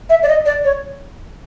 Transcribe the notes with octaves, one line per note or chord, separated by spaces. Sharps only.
E5
D5
D#5
D5
C#5